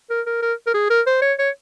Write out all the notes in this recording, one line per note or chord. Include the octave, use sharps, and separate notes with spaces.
A#4
A#4
A#4
A#4
G#4
A#4
C5
C#5
C#5